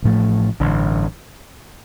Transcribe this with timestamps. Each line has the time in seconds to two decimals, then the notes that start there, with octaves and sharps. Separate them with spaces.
0.02 A1 A2 F3 A3
0.60 A1 G2 D3